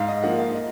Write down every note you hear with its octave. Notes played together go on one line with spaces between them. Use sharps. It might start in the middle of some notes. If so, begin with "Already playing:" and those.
Already playing: G#2 F5
D#5
F3 A#3 F#5
F5
D#5